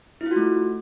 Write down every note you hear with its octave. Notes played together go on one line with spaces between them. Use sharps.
E4
F4
F#4
A3